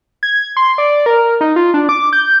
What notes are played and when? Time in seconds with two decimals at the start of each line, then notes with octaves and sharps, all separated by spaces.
0.23 G#6
0.57 C6
0.78 D5
1.06 A#4
1.41 D#4
1.56 F4
1.74 D4
1.89 D6
2.13 G6